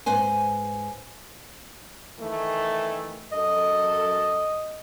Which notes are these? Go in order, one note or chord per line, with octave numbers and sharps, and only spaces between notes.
G#2 B4 C5 G#5
D#3 E3 A3
F#2 A4 D#5